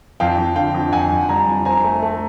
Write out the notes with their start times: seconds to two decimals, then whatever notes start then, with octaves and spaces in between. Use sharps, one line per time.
0.20 F2 F5 G5
0.38 F2
0.56 D3 F5 G5
0.74 F2
0.92 F2 F#5 G#5
1.11 F2
1.29 G3 G#5 A#5
1.47 F2
1.65 C4 G#5 A#5
1.84 A3
2.02 A3